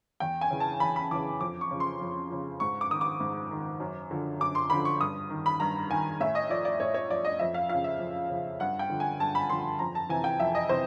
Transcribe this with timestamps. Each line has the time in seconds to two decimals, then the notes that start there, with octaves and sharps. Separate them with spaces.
0.20 E2 G5
0.41 G#5
0.50 C#3 E3
0.60 A5
0.80 E2 B5
0.96 B5
1.11 C#3 E3 D6
1.41 F2 D6
1.61 C#6
1.71 C#3 F3
1.80 C6
2.01 F2
2.30 C#3 F3
2.60 G#2 C#6
2.81 D6
2.90 D#3 D#6
3.01 D6
3.20 G#2
3.51 D#3
3.80 F#2
4.11 D3 F3
4.40 F#2 D6
4.55 C6
4.70 D3 F3 B5
4.85 C#6
5.01 G2 D#6
5.30 D#3
5.46 B5
5.60 G2 A#5
5.90 D#3 G#5
6.20 A2 E5
6.35 D#5
6.50 F3 D5
6.65 D5
6.80 A2 C#5
6.94 C#5
7.09 F3 D5
7.25 D#5
7.39 F2 E5
7.54 F5
7.69 C#3 F3 F5
7.84 E5
8.00 F2
8.30 C#3 F3
8.60 G2 F#5
8.79 G5
8.90 D3 F3
9.00 G#5
9.20 G2 A5
9.35 B5
9.50 D3 F3 C6
9.79 F2 A#5
9.95 A5
10.09 C3 E3 G#5
10.24 G5
10.40 F2 E5
10.55 D#5
10.69 C3 E3 C5